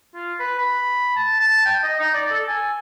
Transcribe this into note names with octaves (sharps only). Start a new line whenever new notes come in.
F4
B4
B5
A5
A5
G5
D#5
D#4
D5
A4
G#5